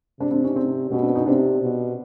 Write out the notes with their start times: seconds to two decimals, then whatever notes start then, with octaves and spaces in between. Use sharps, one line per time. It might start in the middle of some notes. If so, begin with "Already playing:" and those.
0.20 C3 C4 D4
0.31 C4 D4
0.44 C#4 D#4
0.56 C4 D4
0.91 B2 B3 C#4
1.03 C4 D4
1.15 C#4 D#4
1.26 C3 C4 D4
1.62 B2